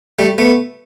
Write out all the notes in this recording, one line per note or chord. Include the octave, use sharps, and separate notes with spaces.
G3 A3
A3 B3